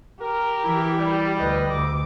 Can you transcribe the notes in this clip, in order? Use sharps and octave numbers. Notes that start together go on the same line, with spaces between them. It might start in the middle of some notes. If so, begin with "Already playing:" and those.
G4 A#4
E3 E4
G3
D2 B4 D#5
D2 D6